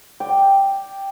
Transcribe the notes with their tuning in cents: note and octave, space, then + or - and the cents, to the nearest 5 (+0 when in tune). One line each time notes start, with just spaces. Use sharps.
D5 +0 G5 +0